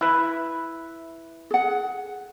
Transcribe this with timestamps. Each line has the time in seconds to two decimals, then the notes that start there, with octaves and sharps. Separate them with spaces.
0.01 E4 B4
1.51 G#4 F#5